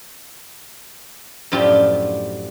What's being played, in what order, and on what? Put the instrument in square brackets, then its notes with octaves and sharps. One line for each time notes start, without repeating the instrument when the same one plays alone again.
[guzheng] F#2 A2 F3 D4 F4 G4